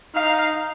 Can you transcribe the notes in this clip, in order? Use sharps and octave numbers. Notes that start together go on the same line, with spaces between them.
D#4 F5